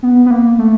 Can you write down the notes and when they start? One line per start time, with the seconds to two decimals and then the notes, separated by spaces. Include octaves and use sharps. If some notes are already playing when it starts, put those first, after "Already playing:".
0.03 B3
0.26 B3
0.31 A#3
0.58 A3